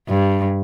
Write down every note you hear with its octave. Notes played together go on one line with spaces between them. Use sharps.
G2